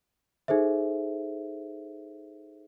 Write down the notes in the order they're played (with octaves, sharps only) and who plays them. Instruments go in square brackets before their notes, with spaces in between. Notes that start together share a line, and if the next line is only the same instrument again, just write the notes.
[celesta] D#4 G#4 A4 C5 E5